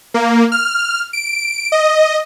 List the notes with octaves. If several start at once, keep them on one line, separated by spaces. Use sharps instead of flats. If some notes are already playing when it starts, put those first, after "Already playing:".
A#3
F6
D7
D#5